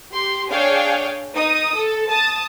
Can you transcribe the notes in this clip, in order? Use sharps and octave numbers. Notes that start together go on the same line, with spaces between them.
G4 C6
D4 G#4 C#5 F5 G5
D#4 D#6
A4
A5 D#6